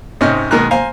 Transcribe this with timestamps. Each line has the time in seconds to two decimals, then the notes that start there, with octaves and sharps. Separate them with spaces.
0.21 G#2 C3 C#4 D#5 F6
0.51 B2 D#3 G#3 A#5 F6 F#6
0.71 C5 F5 G#5 A#5